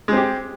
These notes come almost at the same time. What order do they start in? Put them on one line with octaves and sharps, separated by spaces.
G#3 C4 G4